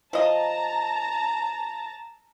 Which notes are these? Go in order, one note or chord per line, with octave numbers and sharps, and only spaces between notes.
F3 D#5 A5 A#5